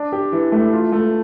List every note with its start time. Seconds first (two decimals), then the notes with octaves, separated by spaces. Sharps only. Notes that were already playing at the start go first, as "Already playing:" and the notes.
Already playing: D4
0.12 G4
0.32 E3
0.52 A3
0.73 F4
0.92 A3